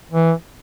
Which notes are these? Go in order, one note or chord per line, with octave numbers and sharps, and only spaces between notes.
E3